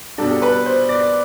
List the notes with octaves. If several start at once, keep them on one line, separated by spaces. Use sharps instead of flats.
B2 G3 D4 A4
A4
B4
C5
D5